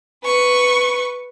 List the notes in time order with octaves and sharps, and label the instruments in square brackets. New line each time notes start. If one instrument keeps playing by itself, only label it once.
[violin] B4 C#6